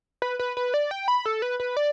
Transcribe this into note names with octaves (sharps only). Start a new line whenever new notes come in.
B4
B4
B4
D5
G5
B5
A4
B4
B4
D5